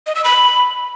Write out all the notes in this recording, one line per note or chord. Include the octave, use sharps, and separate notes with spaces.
D#5
E6
B5